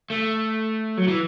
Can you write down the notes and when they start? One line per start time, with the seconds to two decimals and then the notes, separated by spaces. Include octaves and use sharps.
0.10 A3
0.98 F#3
1.08 E3